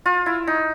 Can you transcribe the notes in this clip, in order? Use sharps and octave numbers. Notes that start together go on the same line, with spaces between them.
F4
E4
D#4